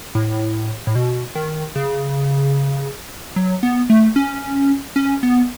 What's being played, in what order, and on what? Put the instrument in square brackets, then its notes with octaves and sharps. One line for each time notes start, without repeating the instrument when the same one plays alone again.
[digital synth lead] A2
A2
B2
D#3
C#3
F#3
B3
A3
C#4
C#4
B3